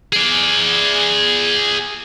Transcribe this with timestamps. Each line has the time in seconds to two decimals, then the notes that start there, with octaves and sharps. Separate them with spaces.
0.13 G#4 D5